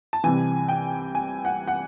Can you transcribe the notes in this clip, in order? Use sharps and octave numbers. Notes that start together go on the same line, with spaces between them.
A5
C2 C3 E3 G#5
G5
G#5
F#5
F#5